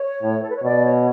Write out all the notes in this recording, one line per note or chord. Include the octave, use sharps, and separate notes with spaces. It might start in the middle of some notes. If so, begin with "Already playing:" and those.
Already playing: C#5
A2
A4
B4
C#5
B2 D5
C#5